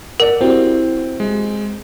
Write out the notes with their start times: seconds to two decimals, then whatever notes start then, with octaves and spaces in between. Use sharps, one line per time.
0.20 A#4 D5 F#5
0.41 C4 E4 F#4 G4
1.20 G#3